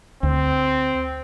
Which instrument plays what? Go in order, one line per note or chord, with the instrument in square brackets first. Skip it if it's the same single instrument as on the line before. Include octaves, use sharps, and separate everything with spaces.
[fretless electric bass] D2 [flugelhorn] C4